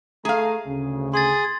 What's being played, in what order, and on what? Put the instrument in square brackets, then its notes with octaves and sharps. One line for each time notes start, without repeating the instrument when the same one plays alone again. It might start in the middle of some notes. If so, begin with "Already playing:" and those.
[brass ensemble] A3 A#5 [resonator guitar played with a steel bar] G#4 F5
[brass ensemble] D2 C#3
[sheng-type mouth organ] G#4 [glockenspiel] C6 A6